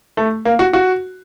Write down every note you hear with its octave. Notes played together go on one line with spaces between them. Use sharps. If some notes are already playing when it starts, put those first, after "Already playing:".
A3
A#3
F#4
F#4